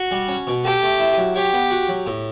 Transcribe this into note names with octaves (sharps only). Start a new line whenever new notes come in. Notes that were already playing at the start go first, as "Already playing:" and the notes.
Already playing: F#4
G3
C#4
B2
G4 A4
A3
E4
F#3
G4 C#5
B3
F#4
F#3
A2